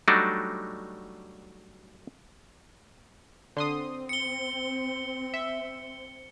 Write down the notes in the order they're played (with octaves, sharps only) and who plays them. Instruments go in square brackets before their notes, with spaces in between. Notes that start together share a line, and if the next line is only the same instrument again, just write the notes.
[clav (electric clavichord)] F#3 G3 A3 D4 D#4 F#4
[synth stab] D3 C6 D#6 [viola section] C4
[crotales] C#7 G7
[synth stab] E5